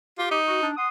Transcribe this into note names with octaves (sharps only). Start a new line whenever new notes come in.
F4 G4
D#4
F#4
D4
F#5 C6 D#6